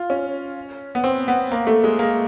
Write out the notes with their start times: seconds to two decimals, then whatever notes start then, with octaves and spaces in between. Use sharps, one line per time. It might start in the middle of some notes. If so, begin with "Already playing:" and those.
Already playing: F4
0.10 C#4
0.95 B3
1.04 C4
1.28 B3
1.52 A#3
1.67 A3
1.84 G#3
1.99 A#3